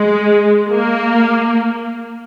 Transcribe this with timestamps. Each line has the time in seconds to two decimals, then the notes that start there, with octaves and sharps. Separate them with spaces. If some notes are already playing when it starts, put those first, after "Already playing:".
Already playing: G#3
0.71 A#3